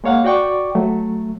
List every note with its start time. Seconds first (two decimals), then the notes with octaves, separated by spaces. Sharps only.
0.04 G#3 A#3 C#5 F5 F#5
0.24 F#4 D5 G5 C#6 D6
0.75 F#3 A3